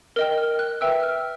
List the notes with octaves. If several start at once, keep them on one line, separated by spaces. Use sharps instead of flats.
A#4 D#5 G5 F6
F6
F#6
B4 E5 G5 E6
F6